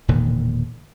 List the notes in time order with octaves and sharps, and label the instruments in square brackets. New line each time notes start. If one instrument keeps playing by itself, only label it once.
[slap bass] E1 A#2 D3 D#3